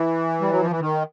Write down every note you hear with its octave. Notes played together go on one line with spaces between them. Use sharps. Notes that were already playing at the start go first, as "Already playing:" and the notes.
Already playing: E3
G3
F#3
F3
E3
D#3